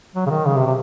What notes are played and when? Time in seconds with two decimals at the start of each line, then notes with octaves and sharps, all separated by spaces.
0.16 F#3
0.26 C#3
0.30 D#3
0.46 C#3
0.56 C3
0.66 C3